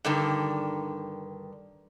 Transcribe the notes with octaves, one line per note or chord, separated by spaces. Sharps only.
G2 D3 D#3